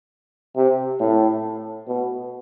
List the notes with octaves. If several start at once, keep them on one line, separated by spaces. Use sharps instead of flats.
C3
A2
B2